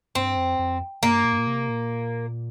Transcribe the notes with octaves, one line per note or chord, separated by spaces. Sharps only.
G2 C4
F2
F2
G2 A#3
A#2
G2
A#2
C3
A#2